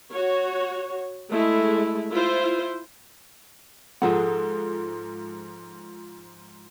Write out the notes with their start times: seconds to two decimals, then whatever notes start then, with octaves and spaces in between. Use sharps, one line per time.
0.13 F#4 C#5
1.30 G#3 A3 E4
2.11 E4 F4 C5
4.02 G#2 F3 G#4 A4 F#5